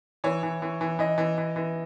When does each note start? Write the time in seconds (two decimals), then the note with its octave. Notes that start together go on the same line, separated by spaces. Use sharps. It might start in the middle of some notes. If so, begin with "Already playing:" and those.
0.24 E3 C#5
0.43 E3
0.62 E3
0.81 E3
0.99 E3 D#5
1.18 E3
1.38 E3
1.56 E3